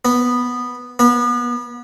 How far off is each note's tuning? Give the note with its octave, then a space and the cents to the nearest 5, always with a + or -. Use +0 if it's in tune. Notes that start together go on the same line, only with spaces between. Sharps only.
B3 -5
B3 -30